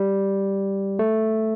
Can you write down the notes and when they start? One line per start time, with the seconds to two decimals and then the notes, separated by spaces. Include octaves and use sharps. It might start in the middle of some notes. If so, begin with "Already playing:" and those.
Already playing: G3
0.99 A3